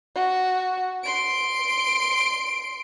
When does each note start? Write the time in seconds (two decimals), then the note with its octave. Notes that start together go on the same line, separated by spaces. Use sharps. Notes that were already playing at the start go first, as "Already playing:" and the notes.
0.15 F#4
1.03 C6 D7